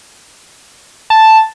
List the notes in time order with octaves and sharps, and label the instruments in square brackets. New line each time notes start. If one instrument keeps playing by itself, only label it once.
[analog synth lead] A5